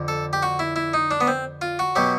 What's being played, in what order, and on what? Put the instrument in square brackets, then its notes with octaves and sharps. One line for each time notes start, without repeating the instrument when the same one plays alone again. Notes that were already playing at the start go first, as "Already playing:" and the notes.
Already playing: [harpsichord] F2 D3
A4
G4
F#4
E4
E4
D#4
D4
B3
C4
F4
F#4
B2 F#3 G4